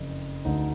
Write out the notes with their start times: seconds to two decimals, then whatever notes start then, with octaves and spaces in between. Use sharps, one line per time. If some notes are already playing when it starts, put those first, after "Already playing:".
Already playing: F#1 F2
0.45 D2 D3 D#4